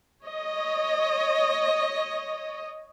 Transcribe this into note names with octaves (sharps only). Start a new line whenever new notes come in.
C#5 D#5